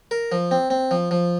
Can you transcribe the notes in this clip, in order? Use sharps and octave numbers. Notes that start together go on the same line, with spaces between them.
A#4
F3
C4
C4
F3
F3